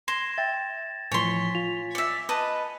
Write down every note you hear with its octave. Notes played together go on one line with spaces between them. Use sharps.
C6 G#6 A#6 E7
E5 G5 A6
A2 E3 F3 C#5 G#5 C6 B6
F4 F7
D5 E5 C#7
B4 D#5 A5